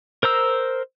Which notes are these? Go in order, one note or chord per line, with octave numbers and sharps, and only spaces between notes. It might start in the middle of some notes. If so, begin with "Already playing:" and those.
A#4 C5 A#5 E6